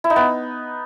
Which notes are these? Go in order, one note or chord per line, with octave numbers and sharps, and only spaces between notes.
E4
D#4
B3